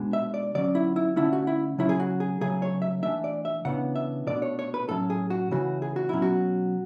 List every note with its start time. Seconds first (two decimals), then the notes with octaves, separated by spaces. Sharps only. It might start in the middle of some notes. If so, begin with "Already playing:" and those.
Already playing: B2 G#3 D4
0.13 E5
0.34 D5
0.55 D3 F#3 C#4 D5
0.75 E4
0.96 E4
1.16 D3 A3 C#4 E4
1.33 F#4
1.47 E4
1.78 C#3 F#3 C#4 E4
1.89 G#4
2.00 F#4
2.20 G#4
2.41 C#3 F#3 A3 G#4
2.62 C#5
2.82 E5
3.02 E3 A3 D4 E5
3.24 D5
3.45 E5
3.65 C#3 E3 B3 D4 F#5
3.96 E5
4.27 B2 A3 D4 D5
4.42 C#5
4.59 C#5
4.74 B4
4.89 A2 F#3 C#4 A4
5.10 G#4
5.30 F#4
5.51 C#3 E3 A3 F#4
5.82 G#4
5.96 F#4
6.09 B2 F#3 C#4 E4
6.22 F#4